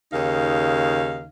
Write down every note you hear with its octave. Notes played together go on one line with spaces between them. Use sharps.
D#2 C#3 D#4 F5